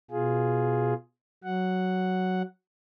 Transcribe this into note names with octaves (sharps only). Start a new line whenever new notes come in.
B2 F4 G#4
F#3 F#5